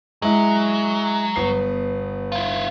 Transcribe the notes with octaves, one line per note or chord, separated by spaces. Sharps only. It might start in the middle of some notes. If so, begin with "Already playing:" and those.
F#3 G#3 E4
G1 B3 C7
E4 F4